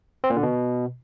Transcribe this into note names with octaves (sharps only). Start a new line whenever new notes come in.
C4
A#2
D3
B2